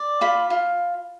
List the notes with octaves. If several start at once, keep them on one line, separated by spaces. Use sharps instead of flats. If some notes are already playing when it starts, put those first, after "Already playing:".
Already playing: D5
F4 B5
F4